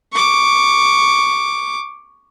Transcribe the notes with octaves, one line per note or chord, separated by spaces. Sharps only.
C#6 D6